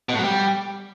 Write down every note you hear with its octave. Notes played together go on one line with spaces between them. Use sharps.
B2
A2
F#3
G3